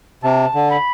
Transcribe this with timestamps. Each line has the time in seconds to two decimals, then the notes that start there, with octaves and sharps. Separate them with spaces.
0.24 C3 A5
0.55 D3
0.71 B5